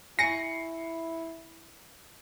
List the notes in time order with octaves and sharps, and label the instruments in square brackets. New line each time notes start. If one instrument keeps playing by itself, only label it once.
[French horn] E4 [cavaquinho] G#5 B5 C#6 [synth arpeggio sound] A#6 [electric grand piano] C7 C#7